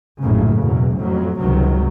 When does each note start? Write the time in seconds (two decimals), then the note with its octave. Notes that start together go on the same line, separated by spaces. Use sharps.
0.21 A#1 F#2 A2 C#3
0.59 F#1 E2 B2 F#3
0.97 F2 A2 F#3
1.39 C#2 G2 C3 D#3 F#3